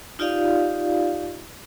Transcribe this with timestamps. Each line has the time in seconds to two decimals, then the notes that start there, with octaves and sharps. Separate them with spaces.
0.19 D#4 F4 G4 D5 D#5 F5